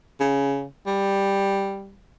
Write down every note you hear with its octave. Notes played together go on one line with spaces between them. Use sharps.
C#3
G3